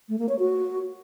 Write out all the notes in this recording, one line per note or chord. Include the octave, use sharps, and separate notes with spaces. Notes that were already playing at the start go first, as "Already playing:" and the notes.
A3
A#3
C#5
F#4